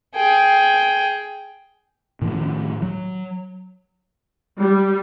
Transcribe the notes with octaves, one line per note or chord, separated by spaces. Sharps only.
G#4 G5
A2 D#3 F3 C#4
F#3
G3